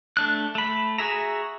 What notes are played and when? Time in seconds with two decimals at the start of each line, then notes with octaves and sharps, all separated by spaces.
0.17 A3 D4 F#6
0.55 A3 B5
0.98 F#4 G#4 E5 A#5